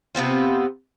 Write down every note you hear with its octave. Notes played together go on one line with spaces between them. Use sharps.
C3 B3 C4 F4